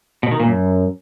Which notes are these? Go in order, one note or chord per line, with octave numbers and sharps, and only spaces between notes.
B2
D#3
A#2
F#2